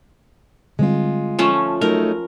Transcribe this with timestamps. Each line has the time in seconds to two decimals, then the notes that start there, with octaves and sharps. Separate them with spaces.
0.79 D3 G3 G#3 C4 F4
1.39 F3 A3 C#4
1.81 F#3 A3 D#4 A#4